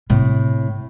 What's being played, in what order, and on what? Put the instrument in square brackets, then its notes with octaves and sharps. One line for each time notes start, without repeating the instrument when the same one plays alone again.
[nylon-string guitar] A2 [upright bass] C3